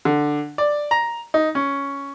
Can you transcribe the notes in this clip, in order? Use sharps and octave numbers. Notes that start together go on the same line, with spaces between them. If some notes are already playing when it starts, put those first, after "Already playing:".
D3
D5
A#5
D#4
C#4